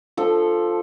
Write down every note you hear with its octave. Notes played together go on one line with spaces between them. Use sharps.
F3 A4